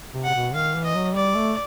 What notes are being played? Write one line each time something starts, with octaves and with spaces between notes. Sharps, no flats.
C3
F#5
C3
B2
D#3 F5
E3
D#5
F#3
G3 D5
A3